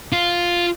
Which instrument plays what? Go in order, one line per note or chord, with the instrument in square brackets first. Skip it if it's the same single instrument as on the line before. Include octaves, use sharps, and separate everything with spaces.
[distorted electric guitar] F4